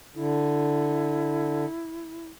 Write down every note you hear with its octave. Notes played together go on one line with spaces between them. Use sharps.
D3 E4